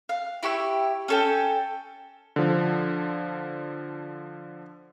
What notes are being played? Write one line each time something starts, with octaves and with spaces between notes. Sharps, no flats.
F5
E4 G4 C#6 E6
C#4 A4 G5
D3 F3